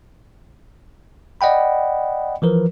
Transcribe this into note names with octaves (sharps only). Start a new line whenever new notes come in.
D5 D#5 F#5 G5 B5
E3 F3 A#4 B4